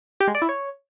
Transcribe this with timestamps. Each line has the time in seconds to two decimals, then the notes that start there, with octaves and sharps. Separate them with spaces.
0.20 G4
0.28 G#3
0.35 D5
0.42 E4
0.49 C#5